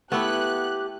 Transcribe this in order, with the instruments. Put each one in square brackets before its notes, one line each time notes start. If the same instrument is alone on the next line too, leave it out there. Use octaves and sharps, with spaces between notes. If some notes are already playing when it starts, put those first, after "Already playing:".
[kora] A3 E4 [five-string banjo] B3 [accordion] G4 [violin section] F#6